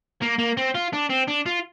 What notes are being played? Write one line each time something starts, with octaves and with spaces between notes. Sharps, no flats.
A#3
A#3
C4
F4
D4
C4
D4
F4